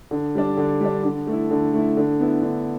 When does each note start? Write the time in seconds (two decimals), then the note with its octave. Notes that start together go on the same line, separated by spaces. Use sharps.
0.11 D3
0.35 G3 D4
0.57 D3
0.81 G3 D4
1.03 D3
1.27 A3 E4
1.51 D3
1.74 A3 E4
1.97 D3
2.20 B3 E4
2.42 D3